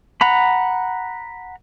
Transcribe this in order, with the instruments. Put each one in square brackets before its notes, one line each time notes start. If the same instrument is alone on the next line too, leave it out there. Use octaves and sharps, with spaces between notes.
[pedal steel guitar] F#5 A#5 B5